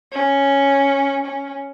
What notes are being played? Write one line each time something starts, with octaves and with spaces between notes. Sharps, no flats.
C#4
C#4